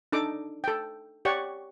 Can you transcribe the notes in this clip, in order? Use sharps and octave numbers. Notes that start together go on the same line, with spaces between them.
D4 D#4 A4 D6
A4 G5
G4 C#5 D5 F#5 C#6